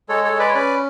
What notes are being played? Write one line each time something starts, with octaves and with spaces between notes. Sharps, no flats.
G#3 A4 C#5
A4 C#5
G#3
B4 D5
C#5
C#4 B4 D5